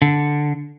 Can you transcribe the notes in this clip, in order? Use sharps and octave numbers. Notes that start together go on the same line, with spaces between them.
D3